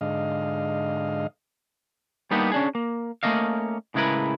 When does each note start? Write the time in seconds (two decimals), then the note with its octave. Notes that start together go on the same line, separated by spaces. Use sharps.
0.01 G#2 D3 D#5 F5
2.31 G3 A#3 B3 D4 D#4 G4
2.52 C#4 D4 G#4
2.75 A#3
3.23 A3 A#3 C#4 D#5 F5
3.94 A2 C#3 G#3 E4 A#4 B4